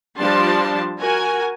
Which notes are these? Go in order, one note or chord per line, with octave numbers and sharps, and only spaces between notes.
F3 G3 D4 A5 C6
F#4 A#4 G#5